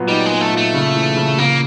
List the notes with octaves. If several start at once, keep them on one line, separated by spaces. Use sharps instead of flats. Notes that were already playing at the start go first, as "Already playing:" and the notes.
Already playing: A#2 F#3 B3
G3 D#4
G#3 B3
A3
A#2
A3
C#3
E3
C#3
C#3 A#3